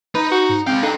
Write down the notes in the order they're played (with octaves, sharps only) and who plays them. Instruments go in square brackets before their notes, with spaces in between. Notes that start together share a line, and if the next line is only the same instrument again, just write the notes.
[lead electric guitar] D#4 [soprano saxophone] B4
[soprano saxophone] F#4
[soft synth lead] G#2
[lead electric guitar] G#3 F5 [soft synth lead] C4 [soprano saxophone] G5
[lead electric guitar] D4 G5 [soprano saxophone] D#4 [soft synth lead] A4